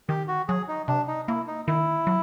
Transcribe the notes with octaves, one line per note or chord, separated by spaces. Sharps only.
D#3 G4
F#4
F#3 G#4
D#4
C3 D4
D#4
A#3 E4
D#4
D#3 E4
F#3